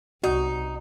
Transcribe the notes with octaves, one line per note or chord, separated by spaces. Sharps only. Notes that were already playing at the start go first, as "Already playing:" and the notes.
C2 D#4 F#4